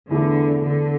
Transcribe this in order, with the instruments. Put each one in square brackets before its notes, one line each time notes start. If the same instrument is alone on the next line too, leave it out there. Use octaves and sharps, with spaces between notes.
[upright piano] E2 E3 A3 E4 [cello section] D3
[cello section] D3